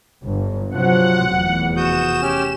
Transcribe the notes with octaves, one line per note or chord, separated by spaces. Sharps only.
G1 G2
C3 F3 F#3 F#5
F1 E2
F#4 D#6 G6 E7
C#4 G4 F6